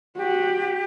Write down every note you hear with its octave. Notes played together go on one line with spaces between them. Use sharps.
F#4 G4